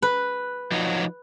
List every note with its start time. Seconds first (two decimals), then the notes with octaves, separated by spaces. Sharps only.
0.02 B4
0.71 F3 F#3 D#4